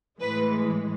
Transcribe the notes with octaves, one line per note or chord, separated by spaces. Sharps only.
A2 E3 G#3 B4